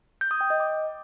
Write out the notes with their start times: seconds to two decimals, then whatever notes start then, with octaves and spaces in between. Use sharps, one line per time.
0.21 G6
0.31 D#6
0.41 G5
0.50 D#5
0.60 D6